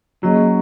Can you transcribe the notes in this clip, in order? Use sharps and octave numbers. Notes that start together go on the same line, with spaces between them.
F#3 A#3 C#4 G#4 D#5